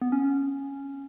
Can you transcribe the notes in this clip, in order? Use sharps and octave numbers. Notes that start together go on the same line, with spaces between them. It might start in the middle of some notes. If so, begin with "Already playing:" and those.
B3
C#4